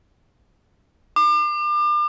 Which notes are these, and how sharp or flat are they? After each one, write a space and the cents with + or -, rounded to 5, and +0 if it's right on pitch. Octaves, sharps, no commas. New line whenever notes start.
D6 +35